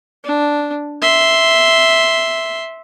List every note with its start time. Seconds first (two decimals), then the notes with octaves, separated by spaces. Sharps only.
0.25 D4
1.02 E5 C6